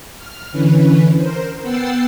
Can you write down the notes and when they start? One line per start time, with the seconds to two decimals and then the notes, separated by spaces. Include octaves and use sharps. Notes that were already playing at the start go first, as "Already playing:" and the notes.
0.18 F6
0.52 D3 E3 C#4 B4
1.16 A#4 C5
1.62 B3 F#5 G5 E6 A6 C7